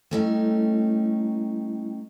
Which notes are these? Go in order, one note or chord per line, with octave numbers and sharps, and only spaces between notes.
G3 A3 C#4 D#4 E4 G5